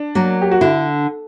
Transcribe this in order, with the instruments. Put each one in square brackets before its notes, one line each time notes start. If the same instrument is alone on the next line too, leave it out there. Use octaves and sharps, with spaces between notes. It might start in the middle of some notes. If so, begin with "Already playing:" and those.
Already playing: [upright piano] D4
[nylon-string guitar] F#3 A#3
[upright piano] G4
F#4
[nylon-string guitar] D3 [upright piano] E4